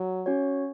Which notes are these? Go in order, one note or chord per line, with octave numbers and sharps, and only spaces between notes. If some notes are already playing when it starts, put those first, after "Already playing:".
Already playing: F#3
C#4 F#4 C#5